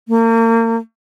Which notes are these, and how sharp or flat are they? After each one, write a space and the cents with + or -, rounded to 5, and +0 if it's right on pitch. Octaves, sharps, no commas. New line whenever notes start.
A#3 -35